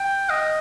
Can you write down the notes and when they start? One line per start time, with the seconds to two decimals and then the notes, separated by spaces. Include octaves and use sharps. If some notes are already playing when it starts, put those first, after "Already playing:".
Already playing: G5
0.30 D#5